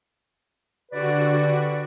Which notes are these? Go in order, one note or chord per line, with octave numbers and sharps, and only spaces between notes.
D3 F#4 G4 B4 D5